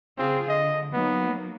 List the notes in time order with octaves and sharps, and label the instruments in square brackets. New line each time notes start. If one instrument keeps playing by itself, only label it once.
[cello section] C#3 F4 G#4 [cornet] C4
[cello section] D3 [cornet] D#5
[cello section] F#3 A#3 D#4 [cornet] B3